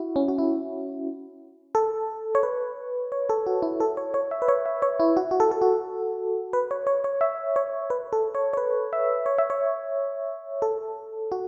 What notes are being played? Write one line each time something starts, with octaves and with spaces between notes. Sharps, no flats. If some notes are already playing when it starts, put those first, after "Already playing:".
Already playing: E4 F#4
C#4
F#4
E4
A4
C#5
B4
C#5
A4
F#4
E4
A4
C#5
C#5
E5
B4
C#5
E5
C#5
E4
F#4
F#4
A4
A4
F#4
B4
C#5
C#5
C#5
E5
C#5
B4
A4
C#5
C#5
B4
E5
C#5
E5
C#5
A4
F#4